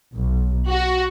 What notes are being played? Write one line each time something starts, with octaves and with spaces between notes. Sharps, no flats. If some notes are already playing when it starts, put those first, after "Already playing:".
B1
F#4